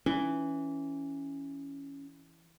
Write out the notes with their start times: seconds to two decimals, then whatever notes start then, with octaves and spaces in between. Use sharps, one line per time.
0.06 E3 C#4